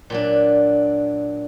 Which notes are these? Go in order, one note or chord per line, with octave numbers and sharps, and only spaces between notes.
A#2 F#3 D4